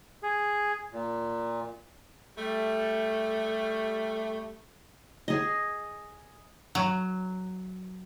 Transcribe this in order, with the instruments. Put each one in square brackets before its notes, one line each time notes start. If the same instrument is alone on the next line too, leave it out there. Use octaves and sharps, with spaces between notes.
[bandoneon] G#4
A#2
[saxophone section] G3 A3
[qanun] G#4 D#5
[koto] F#3